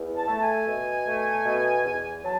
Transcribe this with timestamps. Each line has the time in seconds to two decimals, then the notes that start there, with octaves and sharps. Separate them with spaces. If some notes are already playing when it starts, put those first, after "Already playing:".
Already playing: E2
0.16 A5
0.28 A3
0.41 G#5
0.67 B2
1.06 A3
1.45 B2
1.85 E2
2.23 F#3 A5